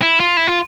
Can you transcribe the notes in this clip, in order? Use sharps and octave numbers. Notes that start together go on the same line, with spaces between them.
E4
F4
E4
F4